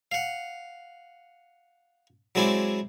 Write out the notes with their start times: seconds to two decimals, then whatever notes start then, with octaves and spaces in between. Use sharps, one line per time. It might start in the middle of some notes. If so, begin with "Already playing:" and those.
0.12 F5 F#5
2.35 F#3 G#3 C4 E4 D5